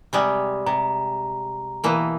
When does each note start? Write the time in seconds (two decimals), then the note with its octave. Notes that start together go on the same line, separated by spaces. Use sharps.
0.13 C3 G3 G#3
0.66 C3 A#5
1.84 B2 E3 A#3